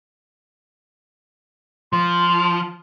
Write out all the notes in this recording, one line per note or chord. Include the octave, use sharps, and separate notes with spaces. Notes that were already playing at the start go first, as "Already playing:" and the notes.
F3 C6